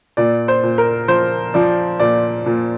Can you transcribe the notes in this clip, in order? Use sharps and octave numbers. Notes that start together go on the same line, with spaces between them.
A#2 D5
C5
A#2
A#4
F3 C5
F3 D5
A#2 D5
A#2